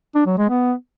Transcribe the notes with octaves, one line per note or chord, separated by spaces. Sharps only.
D4
F#3
G#3
B3